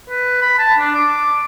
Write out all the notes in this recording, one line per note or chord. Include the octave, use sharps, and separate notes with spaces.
B4
B5
A5
D4
D6